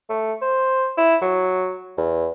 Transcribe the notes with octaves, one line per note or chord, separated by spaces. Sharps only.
A3
C5
E4
F#3
E2